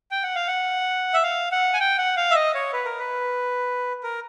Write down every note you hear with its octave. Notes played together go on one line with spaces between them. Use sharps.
G5
F#5
F5
F#5
E5
F5
F#5
G#5
G5
F#5
F5
E5
D#5
C#5
B4
A#4
B4
A#4